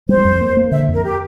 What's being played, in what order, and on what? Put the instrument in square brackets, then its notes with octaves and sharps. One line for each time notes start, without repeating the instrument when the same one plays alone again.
[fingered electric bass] G3 [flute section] C5
[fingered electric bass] F2
A#3
A#3
[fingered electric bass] D3 [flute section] E5
[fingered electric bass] F2 [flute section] A#4
[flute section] G4